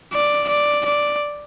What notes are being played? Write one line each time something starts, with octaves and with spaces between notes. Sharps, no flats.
D5
D5
D5